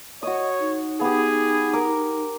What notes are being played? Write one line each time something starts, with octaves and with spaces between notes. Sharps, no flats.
F#4 C#5 D#5 D#6
D#4
B3 G4 G#4
A#4 D6